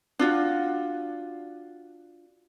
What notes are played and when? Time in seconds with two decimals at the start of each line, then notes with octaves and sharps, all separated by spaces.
0.19 D4 F4 F#4